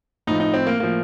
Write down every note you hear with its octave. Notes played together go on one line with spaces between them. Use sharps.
A2 F3 D#4
D#4
C4
A#3
A2 F3 A#3